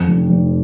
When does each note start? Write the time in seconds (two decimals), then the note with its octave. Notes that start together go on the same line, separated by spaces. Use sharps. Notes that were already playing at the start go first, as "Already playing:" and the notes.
Already playing: F2
0.08 F1
0.30 F1